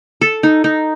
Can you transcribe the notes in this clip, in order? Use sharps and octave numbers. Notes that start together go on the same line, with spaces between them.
A4
D#4
D#4